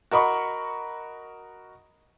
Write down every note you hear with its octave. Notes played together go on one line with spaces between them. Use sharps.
F#4 A#4 D#5 B5 C#6